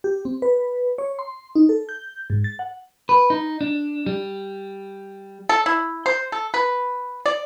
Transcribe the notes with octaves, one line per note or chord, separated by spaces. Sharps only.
G4
C4
B4
C#5
C6
D#4
A4
G6
G#2
A6
F#5
B4
D#4
D4
G3
A4
E4
C5
A4
B4
D5